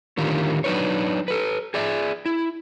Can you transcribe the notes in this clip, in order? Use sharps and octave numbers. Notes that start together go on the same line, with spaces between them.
A2 D3 D#3 F4 G4 A#4
F#3 D4 D#4 B4 C#5
A4 B4
G#4 D5 E5
E4